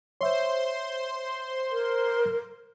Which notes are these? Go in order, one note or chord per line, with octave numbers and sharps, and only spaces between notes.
C5 C#5 E5 C6
A#4